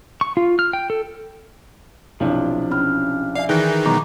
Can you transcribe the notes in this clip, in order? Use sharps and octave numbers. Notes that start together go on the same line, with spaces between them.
C#6
F4
F6
G5
A4
B1 C3 F3 D4 E4
C#4 B5 F6
D5 E5 F5 G#5
D#3 E3 D#4 G#4 G5 F#6 A#6
B2 F#3 G#3 A#5 C#6 D6